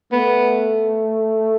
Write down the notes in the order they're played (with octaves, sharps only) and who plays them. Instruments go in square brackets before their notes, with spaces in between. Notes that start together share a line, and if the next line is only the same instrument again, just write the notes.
[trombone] A3 [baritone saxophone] B3